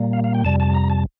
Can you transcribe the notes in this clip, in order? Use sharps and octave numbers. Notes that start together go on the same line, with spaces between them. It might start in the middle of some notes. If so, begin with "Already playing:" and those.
Already playing: A#2 G3 A#3
F5
F5
G5
F2 C3 G3 A5
A5
A#5
A5